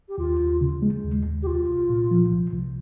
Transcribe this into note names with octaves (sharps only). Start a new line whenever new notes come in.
G4
D#2 F4
D#2
C#3
G#3
D#2
D#2
G4
C2 F4
C2
A#2
F3
C2
C2